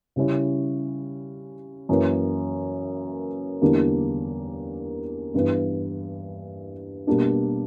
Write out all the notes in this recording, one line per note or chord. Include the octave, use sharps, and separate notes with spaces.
C#3 G3 C#4 E4
F#2 E3 A#3
E2 D3 G3 A#3 D4
G2 E3 B3
B2 G3 A#3 D4